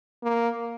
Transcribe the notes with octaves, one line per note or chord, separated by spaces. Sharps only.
A#3